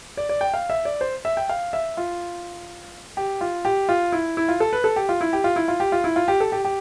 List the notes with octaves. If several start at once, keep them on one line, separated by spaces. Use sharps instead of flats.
D5
D5
G5
F5
E5
D5
C5
E5
G5
F5
E5
F4
G4
F4
G4
F4
E4
E4
F4
A4
B4
A4
G4
F4
E4
G4
F4
E4
F4
G4
F4
E4
F4
G4
A4
G4
G4